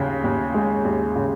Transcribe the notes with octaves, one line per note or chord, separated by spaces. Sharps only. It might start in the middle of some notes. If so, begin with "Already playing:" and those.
Already playing: D#2 C#3
D#2
G#3
D#2
C#3